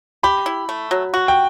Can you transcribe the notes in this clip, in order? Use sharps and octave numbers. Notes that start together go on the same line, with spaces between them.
G4 B5
E4
A3
F#3
F#4
G5